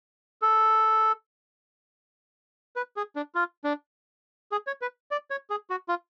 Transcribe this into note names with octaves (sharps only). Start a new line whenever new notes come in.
A4
B4
G#4
D4
F4
D4
G#4
C#5
B4
D5
C#5
G#4
F#4
F4